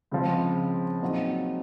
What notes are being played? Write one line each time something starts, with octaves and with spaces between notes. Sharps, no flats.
C#2 C#3 F3 G#3 C4
A#2 F#3 C4 D#4 F#4